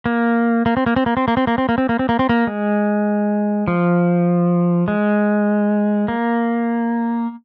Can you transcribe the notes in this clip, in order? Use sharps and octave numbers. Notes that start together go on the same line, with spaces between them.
A#3
A#3
C4
A#3
C4
A#3
C4
A#3
C4
A#3
C4
A#3
C4
A#3
C4
A#3
C4
A#3
G#3
F3
G#3
A#3